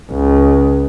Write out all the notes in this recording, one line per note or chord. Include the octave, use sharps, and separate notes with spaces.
C#2